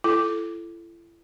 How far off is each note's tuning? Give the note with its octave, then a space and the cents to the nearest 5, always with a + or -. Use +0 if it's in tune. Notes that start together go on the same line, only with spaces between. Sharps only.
E4 +40 A4 -10